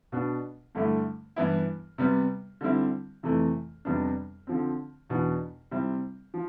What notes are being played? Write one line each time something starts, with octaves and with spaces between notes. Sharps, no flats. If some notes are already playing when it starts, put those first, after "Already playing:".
B2 B3 D4
G2 D3 A3 E4
G2 E3 B3 E4
C3 G3 B3
D3 G3 C4 E4
F2 C3 E3 A3
F2 C3 G3 B3 D4
D3 F3 C4
E2 B2 B3 D4
C3 G3 C4 E4
F3